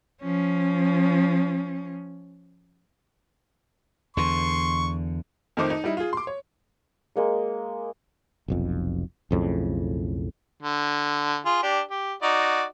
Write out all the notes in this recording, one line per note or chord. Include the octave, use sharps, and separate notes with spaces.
F3 C#4
E2 D3 C6 C#6
F2 D#3 A3 D#4 C5 D6
D#4
G3 D#4 E4
F4 G#4
C6 D6
C#5
G#3 A#3 C#6
F1 B1 F2
B1 F2 A2 C#3
D3
F4 G#4
D4 G4
G4
D#4 F#4 D5